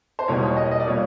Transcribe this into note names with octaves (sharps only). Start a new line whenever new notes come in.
C5
E2 B2 G3 A#3 C#5
C#5
D#5
D#5
D5
A#2 G3 A#3 C#5